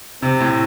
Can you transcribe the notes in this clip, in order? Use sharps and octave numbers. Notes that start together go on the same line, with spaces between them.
C3 C4
A2